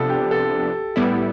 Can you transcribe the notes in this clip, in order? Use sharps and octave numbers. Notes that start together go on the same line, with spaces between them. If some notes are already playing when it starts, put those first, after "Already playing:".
Already playing: C3 F3 B3 D4 A4
G4
A4
A2 G3 B3 E4